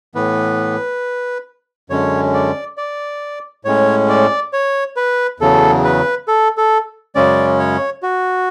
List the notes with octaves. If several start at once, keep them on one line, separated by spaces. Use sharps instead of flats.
A2 E3 B3 B4
F#2 D3 G#3 C#4 C#5
D5
D5
A2 G#3 C#4 C#5
D5
C#5
B4
E2 C#3 F#3 A4
B4
A4
A4
F#2 C#3 G#3 C#4 D5
C#5
F#4